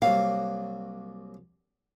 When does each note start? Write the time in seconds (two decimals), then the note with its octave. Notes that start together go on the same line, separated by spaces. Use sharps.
0.02 C2 F#3 A#3 F5